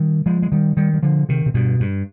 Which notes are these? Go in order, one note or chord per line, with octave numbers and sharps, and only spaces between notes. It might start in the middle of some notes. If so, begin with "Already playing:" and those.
Already playing: D#3 G3
F3 G#3
G#3
D#3 G3
D#3 G3
G3
D3 F3
C3 D#3
C3
G2 B2
G2